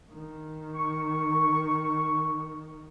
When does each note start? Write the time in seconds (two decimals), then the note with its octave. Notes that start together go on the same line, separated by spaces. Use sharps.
0.11 D#3
0.75 C#6